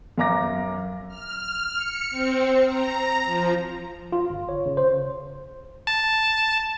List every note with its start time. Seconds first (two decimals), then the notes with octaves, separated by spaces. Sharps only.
0.18 F#2 F5 A#5 D6 A#6
1.08 F6
1.75 C#7
2.10 C4
2.66 A#5
3.25 F3
4.12 F4
4.30 G1
4.49 C#5
4.66 C#3
4.77 C5
5.87 A5